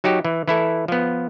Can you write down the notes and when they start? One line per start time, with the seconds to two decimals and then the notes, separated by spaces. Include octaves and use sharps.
0.04 F#3 D#4 F#4 G4
0.25 E3
0.48 E3 E4 A4
0.88 F3 B3